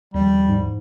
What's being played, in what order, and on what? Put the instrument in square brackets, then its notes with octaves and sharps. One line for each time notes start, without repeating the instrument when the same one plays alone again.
[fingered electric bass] D#2 F3 [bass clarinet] G3
[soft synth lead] G#2